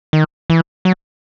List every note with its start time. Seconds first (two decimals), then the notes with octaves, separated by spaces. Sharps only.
0.13 D#3
0.50 E3
0.85 F#3